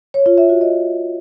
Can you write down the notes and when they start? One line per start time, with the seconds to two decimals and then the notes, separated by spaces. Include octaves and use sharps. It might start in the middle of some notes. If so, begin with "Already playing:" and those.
0.14 C#5
0.26 F4
0.38 E5
0.49 F#4
0.61 D#5